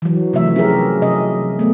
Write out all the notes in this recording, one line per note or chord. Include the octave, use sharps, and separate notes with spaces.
E3 F#3
C3 E3 F3 A3 E5
C#4 G4 G#4 A#4
C3 F#3 D#5
A3 B3